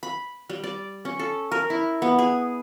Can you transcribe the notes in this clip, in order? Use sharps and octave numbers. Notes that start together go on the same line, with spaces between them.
B5
G3
D5
C#4
A4
A#4
E4
B3
G#4